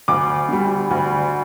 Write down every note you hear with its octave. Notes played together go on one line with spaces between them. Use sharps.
D2 D6
D3 G3
D2